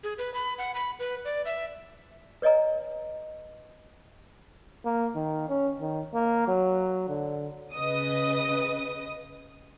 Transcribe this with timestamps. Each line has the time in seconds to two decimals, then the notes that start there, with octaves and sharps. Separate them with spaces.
0.04 G#4
0.18 B4
0.34 B5
0.58 F#5
0.74 B5
0.99 B4
1.25 D5
1.45 E5
2.42 B4 C#5 D#5 G#5 A#5
4.85 A#3
5.15 D#3
5.49 C#4
5.81 D#3
6.14 A#3
6.48 F#3
7.09 D3
7.75 C#3 B4 D#5 D#6